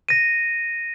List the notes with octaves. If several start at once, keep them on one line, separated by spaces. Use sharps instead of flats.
A#6 D#7